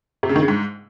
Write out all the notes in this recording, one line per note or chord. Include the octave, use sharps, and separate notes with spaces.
C3
C#3
D#3
C#3
G#2